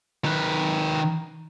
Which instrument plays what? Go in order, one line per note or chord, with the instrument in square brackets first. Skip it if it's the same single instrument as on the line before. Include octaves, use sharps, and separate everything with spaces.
[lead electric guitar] D#3 B4